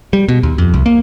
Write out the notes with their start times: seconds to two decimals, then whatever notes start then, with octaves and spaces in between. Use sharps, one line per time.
0.13 G3
0.29 B2
0.43 D#2
0.58 F2
0.74 C2
0.86 A#3